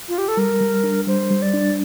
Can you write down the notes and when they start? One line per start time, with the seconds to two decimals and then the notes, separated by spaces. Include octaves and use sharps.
0.08 F4
0.18 G4
0.28 A4
0.37 G3 A#4
0.61 G3
0.84 D4
1.07 G3 C5
1.30 G3
1.42 D5
1.54 D4